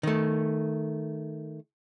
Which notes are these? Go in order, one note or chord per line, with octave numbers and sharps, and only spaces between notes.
D#3 A3